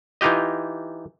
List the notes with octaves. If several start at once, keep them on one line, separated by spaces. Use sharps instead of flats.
E3 D#4 F4 G4 D#5